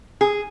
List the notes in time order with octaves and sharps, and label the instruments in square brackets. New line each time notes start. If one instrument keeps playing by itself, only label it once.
[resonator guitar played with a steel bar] G#4